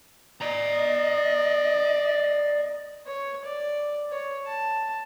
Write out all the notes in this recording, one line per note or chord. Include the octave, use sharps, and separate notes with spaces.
D5 D#5 A#5
C#5
D5
C#5
A5